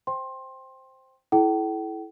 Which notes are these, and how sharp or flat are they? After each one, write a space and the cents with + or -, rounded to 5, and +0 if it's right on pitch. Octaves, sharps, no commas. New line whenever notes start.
C5 +0 G5 +0 C6 +20
E4 +0 A4 -40 G5 -40